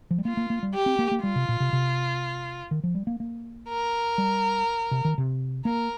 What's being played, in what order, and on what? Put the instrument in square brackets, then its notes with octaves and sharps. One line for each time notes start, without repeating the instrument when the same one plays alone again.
[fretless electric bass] F3
G3
[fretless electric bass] A#3 [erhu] F4
[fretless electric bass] A#3
A#3
G3
[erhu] G4
[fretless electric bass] C4
A#3
A#3
[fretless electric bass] G3 [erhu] F4
[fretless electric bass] C3
A#2
C3
C3
D#3
F3
G3
A#3
A#3
[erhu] A#4
[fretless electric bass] G3
C3
D#3
C3
[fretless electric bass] A#3 [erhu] A#4